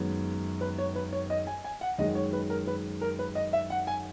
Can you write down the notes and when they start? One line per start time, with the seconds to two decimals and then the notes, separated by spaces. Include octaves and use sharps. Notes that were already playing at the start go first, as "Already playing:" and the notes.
Already playing: F#2 D#3 G#3 B3
0.61 B4
0.78 C#5
0.95 B4
1.13 C#5
1.30 D#5
1.47 G#5
1.64 G#5
1.81 F#5
1.98 F#2 D#3 G#3 D#5
2.15 C#5
2.33 B4
2.50 A#4
2.67 B4
3.01 A#4
3.19 B4
3.35 D#5
3.53 E5
3.70 F#5
3.87 G#5